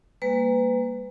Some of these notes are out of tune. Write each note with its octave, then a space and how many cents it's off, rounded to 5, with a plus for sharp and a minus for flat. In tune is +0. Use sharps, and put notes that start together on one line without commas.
G3 +45 A#3 +0 B4 +30